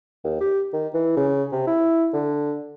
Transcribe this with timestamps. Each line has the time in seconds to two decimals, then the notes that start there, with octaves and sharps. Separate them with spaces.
0.24 D#2
0.40 G4
0.73 D#3
0.94 E3
1.17 C#3
1.52 C3
1.67 E4
2.13 D3